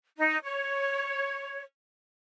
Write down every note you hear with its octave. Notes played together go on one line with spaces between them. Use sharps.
D#4
C#5